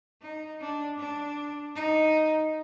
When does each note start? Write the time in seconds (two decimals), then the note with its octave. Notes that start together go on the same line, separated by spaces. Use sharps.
0.22 D#4
0.61 D4
0.99 D4
1.75 D#4